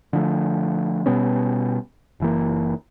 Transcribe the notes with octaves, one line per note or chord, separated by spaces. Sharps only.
D3 F3 A3
B2 G3 B3 C#4
F#1 E3 A#3